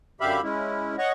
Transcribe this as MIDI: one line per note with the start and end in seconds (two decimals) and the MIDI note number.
0.21 0.41 42
0.21 0.41 50
0.21 0.41 67
0.21 0.41 76
0.21 0.41 77
0.21 0.41 83
0.43 0.96 56
0.43 0.96 61
0.43 0.96 64
0.98 1.12 73
0.98 1.12 75
0.98 1.12 78
0.98 1.12 85